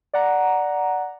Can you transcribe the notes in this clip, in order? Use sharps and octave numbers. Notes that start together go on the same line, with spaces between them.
D5 F#5 A#5